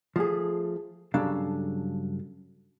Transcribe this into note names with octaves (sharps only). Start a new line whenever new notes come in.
F3 A3 G#4
G2 C#3 F#3 D4 A4 F5